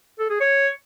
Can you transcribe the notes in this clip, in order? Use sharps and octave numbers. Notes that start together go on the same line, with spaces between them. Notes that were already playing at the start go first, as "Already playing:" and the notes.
A4
G#4
C#5